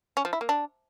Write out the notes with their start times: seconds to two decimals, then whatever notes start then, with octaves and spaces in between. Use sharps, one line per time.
0.17 C#4
0.25 F3
0.33 E4
0.41 A#3
0.49 D4